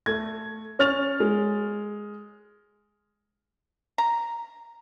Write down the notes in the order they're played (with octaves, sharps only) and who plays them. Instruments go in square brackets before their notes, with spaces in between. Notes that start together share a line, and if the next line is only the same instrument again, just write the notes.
[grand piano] A3 G#6
C#4 F6 A6 F7
G#3
[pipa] A#5